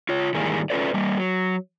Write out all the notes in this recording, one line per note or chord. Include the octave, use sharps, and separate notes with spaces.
F4 C#5
G#2 D#3 E3 G3 A#3 G#4
C#4 F4 A4 B4 D5
G3 A#3
F#3